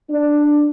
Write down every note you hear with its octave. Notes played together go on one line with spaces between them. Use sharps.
D4